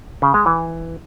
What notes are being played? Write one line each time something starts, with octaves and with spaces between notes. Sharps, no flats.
C#3
G#3
E3